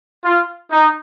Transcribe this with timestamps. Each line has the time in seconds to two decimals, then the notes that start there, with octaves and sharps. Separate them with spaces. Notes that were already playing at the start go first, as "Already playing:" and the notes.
0.24 F4
0.71 D#4